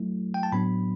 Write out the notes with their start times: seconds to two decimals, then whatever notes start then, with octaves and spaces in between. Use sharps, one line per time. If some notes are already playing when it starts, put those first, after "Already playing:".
Already playing: F#3 A3 E4
0.34 G5
0.43 A5
0.52 A2 F#3 B3 D4 B5